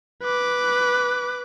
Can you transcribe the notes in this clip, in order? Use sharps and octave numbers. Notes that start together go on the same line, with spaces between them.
B4 D6